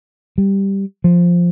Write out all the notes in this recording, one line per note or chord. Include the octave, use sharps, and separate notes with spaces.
G3
F3